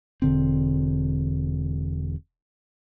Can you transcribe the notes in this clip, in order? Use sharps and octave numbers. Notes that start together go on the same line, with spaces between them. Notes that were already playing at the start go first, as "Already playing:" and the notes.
E1 D3 C4